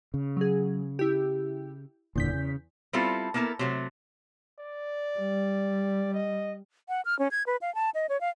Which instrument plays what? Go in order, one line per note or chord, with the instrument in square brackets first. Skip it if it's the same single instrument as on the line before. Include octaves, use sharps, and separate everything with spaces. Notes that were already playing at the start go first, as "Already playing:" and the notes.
[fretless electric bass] C#3
[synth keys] F#3 G#4
E4 G4
[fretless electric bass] F#1 A#2 D3 [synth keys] E2 G6 B6
[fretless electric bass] C#3
[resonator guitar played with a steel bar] G3 B3 C4 E4 F4 A4
A#3 B3 E4 A4 A#4
C3 F#3 A3
[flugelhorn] D5
[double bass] G3
[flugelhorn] D#5
[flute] F#5
F6
C#4
G#6
B4
F5
A5
D#5
C#5
F5